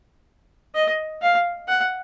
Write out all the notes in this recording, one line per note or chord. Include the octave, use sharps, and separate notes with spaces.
D#5
F5
F#5